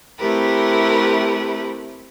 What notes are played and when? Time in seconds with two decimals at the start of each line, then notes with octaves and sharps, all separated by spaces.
0.19 A3 C4 E4 G4 A#4 B4